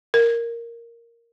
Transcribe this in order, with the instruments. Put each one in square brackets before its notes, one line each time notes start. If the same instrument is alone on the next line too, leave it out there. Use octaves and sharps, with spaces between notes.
[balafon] A#4